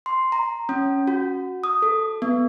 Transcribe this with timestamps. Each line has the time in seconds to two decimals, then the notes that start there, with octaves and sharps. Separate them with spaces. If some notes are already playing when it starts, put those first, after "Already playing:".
0.06 C6
0.32 A#5
0.69 C#4
1.07 F#4
1.64 D#6
1.82 A4
2.22 B3